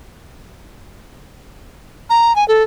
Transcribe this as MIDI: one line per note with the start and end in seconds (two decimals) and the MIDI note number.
2.10 2.35 82
2.36 2.46 80
2.48 2.63 69